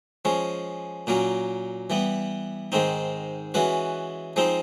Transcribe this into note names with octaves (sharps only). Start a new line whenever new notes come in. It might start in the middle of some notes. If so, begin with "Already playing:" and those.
F3 G#3 C#4
A#2 F#3 A#3 C#4
E3 G3 B3
G#2 D#3 G#3 C4 D#4
E3 G#3 C#4 F#4 B4
F3 G#3 C4 D#4